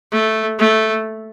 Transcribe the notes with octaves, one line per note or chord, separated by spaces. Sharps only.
A3
A3